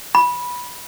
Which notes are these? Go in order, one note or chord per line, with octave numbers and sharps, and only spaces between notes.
B5